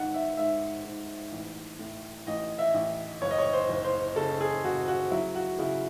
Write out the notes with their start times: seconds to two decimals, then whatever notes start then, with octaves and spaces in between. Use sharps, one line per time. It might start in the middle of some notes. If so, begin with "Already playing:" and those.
Already playing: G#1 G#2 F#5
0.14 E5
0.37 G#2 E5
0.85 G#2
1.32 A1
1.79 A2
2.27 A1 D#5
2.59 E5
2.74 A1
3.22 F#1 C#5
3.31 D#5
3.38 C#5
3.54 C5
3.69 F#1
3.84 C5
4.16 C#3 A4
4.41 G#4
4.64 C#3 F#4
4.88 F#4
5.11 F#3 E4
5.35 F#4
5.58 C#3 E4